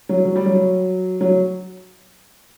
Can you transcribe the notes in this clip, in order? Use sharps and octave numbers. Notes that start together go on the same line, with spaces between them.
F#3
F#3
G3
F#3
F#3